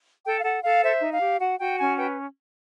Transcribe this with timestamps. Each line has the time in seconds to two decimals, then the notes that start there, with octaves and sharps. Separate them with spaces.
0.25 A4 G5
0.38 F5
0.44 A4 F#5
0.63 A4 F5
0.82 C5 E5
1.02 D#4
1.11 F5
1.22 G4
1.40 F#4 F#5
1.59 F#4 G5
1.78 C#4 G#5
1.97 B4 G5